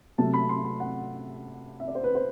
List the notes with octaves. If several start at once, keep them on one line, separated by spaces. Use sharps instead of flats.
C3 F#3 A3 A5
B5
C6
B5
F#5
E5
D5
C5
B4
C5